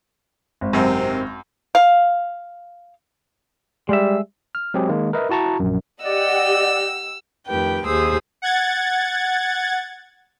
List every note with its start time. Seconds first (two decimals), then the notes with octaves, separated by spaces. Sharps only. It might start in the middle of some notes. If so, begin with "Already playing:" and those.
0.61 G#1
0.73 F#2 C3 D#3 C4
1.75 F5
3.89 G3 G#3 E5
4.55 F6
4.74 F#3 G#3 C4 G4 G#4
4.89 D#3 G#3 A#3
5.13 A#4 B4 D#5 E5
5.29 E4 F#4 A5 A#5 C#6
5.60 A#1 F#2
6.04 G4 D5 D#5 F#5 E6
7.47 F2 D#3 A3 G4 B4 G5
7.86 D#2 G4 G#4 C5 D#6 E6
8.42 F#5 G#6 A6